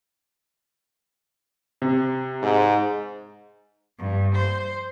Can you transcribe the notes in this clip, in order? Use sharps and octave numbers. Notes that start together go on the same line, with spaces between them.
C3
G#2
G2
C5